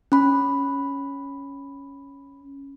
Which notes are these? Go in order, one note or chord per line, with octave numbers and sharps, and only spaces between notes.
C#4 B5